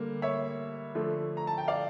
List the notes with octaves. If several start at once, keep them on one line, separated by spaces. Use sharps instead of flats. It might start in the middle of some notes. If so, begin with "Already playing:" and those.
Already playing: D3 G3 A#3
C#5 E5
D3 F3 A3
A#5
A5
G5
D5 F5